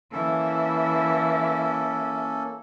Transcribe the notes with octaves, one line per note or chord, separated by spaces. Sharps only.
E3 A#3 C#4 E4 A4